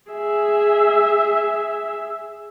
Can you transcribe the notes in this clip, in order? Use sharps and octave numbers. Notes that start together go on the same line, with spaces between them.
G#4 E5